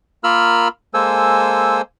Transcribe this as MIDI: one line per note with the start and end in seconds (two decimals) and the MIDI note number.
0.24 0.68 58
0.24 0.68 65
0.24 0.68 70
0.24 0.68 83
0.24 0.68 88
0.24 0.68 89
0.94 1.82 56
0.94 1.82 58
0.94 1.82 69
0.94 1.82 72
0.94 1.82 80
0.94 1.82 88